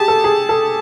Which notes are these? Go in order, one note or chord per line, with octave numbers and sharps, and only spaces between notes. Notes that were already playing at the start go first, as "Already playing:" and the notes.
Already playing: G4 G#4 A5
A4
G#4
A4